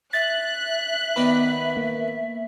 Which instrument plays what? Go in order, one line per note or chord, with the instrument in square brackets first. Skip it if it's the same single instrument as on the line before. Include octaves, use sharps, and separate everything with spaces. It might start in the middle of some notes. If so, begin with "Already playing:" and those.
[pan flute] E5 [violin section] F#6 [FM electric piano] A6
[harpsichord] D#3 B3 D5 [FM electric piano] B5
[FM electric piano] A#3